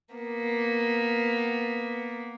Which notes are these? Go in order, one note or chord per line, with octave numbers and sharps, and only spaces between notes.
A#3 B3